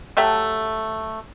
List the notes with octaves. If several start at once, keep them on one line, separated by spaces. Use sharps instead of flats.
F#3 A3 G4 E5